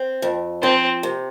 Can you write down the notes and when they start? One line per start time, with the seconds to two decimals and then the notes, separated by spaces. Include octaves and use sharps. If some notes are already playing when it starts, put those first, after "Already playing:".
Already playing: C4
0.22 F2
0.62 F3 C4
1.03 C3